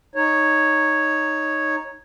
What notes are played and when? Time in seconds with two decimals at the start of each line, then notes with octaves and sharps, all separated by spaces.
0.15 D#4 C#5